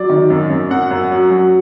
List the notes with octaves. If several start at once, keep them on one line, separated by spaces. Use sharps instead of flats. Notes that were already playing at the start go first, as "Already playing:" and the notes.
Already playing: F#3 D5
D#3
F#2
F#2
F#2 F#5
F#2
F#3
F#3